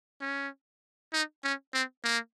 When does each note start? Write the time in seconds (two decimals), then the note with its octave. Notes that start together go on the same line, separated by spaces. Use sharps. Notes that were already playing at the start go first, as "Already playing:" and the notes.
0.21 C#4
1.13 D#4
1.44 C#4
1.74 C4
2.04 A#3